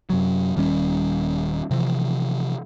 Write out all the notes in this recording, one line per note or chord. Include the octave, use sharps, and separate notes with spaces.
F#2 C3 F#3
D#1 D#3 G3 C#4
C3 E3 F3